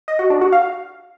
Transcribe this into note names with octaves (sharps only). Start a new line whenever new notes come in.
D#5
F#4
D4
F#4
F5